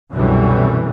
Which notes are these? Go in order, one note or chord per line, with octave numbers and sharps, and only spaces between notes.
C2 F#2 B2 D3 E3 G3